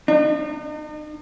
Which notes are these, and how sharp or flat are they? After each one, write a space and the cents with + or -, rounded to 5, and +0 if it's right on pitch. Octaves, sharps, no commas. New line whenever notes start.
D#4 -45